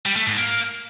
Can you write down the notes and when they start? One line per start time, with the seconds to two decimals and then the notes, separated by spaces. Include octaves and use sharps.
0.06 G3
0.16 A3
0.27 G#2
0.37 A#3